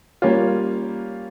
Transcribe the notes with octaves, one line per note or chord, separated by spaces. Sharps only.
G3 A#3 C#4 F4